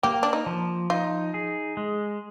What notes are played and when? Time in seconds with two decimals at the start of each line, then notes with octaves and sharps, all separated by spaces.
0.03 A#3 G4
0.23 D4
0.33 D#4
0.46 F3
0.90 D#4 F4
1.34 G#4
1.77 G#3